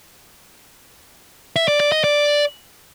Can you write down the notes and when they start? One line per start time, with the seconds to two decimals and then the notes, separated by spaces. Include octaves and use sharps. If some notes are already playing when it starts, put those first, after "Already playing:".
1.56 E5
1.68 D5
1.80 D5
1.92 D#5
2.04 D5